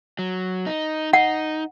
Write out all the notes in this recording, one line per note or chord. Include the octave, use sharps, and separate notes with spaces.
F#3
D#4
D#4 F#5